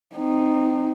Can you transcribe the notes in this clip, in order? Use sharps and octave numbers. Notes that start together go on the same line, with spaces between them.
C4 D#4